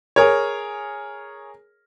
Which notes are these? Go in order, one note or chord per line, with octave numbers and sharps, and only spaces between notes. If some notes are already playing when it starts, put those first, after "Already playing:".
G#4 A#4 C#5